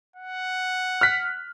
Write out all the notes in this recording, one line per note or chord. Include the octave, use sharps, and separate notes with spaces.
F#5
F6 F#6 B6